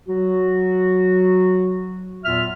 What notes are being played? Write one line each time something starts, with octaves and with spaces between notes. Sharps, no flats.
F#3 F#4
E2 A#2 F#3 F4 E5 F6